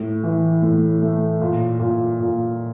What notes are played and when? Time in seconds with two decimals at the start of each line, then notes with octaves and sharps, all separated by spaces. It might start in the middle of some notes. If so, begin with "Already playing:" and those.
Already playing: A2
0.23 E3
0.62 A2
1.02 A3
1.41 A#2
1.80 A#2
2.20 A#2